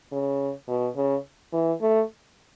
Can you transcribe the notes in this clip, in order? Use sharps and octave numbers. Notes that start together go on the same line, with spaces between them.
C#3
B2
C#3
E3
A3